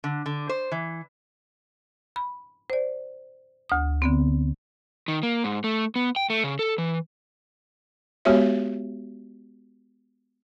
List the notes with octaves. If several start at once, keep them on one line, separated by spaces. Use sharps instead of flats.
D3
D3
C5
E3
B5
C5 D5
D2 D#6
D3 B3 C4
D#3
A#3
G#2
A3
B3
G5
A3
C#3
A4
E3
G#3 B3 F#4 G4 C#5 E5